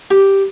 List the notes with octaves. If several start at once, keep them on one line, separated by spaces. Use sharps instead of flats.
G4